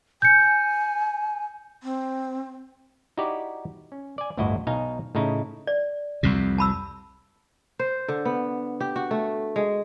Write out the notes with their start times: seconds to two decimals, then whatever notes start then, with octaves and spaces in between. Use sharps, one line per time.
0.22 G#5 G6 C#7
1.83 C4
3.17 D#4 E4 F#4 G4 D5
3.92 C#4
4.18 D5 G#5
4.37 G1 D2 A2 E4 F#4 D#5
4.67 B1 B2 D#4 F5 G#5
5.15 A2 C#3 D#4 E4
5.67 D5
6.23 C2 F2 C3
6.58 A5 B5 E6
7.79 C5
8.08 D3
8.25 B3
8.81 G4
8.96 F#4
9.11 A3
9.56 G#3